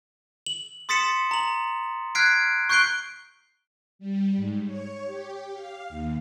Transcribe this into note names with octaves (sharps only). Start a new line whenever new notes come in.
F#7
C6 D#6 A6 B6 C#7 E7
A#5 F#7
F6 F#6 G#6 B6 C7 D7
C#6 F#6 G6 C7 D7 G7
G3
G#2
C#5
G4
F5
D#2